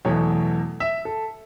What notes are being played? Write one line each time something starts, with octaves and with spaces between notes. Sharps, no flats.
E2 B2 F#3 A3 C#5
E5
A4